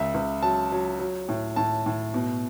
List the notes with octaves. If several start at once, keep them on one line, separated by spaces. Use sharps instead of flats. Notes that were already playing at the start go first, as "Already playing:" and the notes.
Already playing: C#2 E5
C#2
F#3 A5
F#3
F#3
A2
A2 A5
A2
B2